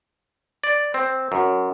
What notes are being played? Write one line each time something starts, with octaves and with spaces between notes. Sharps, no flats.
D5
C4
F#2